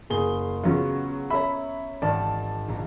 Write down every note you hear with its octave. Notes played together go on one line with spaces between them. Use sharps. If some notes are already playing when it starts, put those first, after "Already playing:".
F#1 G#4 G7
C#3 F#3 B3 C#4 F4
C#5 E5 A#5 B5
G#1 D#3 D5 A5
A#1 A#5